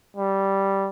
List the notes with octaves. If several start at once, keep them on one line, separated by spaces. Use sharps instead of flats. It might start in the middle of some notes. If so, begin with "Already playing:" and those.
G3